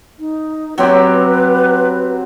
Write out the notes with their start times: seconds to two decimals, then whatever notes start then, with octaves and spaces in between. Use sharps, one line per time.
0.19 D#4
0.78 F#3 C4 G4 B4